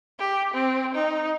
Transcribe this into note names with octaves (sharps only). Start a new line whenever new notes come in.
G4
C4
D#4